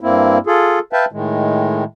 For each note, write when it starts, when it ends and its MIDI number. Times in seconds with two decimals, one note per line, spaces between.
0.01 0.38 43
0.01 0.38 58
0.01 0.38 60
0.01 0.38 64
0.47 0.79 65
0.47 0.79 68
0.47 0.79 69
0.93 1.05 71
0.93 1.05 76
0.93 1.05 77
0.93 1.05 79
0.93 1.05 81
1.12 1.84 45
1.12 1.84 51
1.12 1.84 56